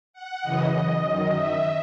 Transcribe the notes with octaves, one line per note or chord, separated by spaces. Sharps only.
F#5
F#2 C#3 E3 D#5
D#5
F#2 D#3
E5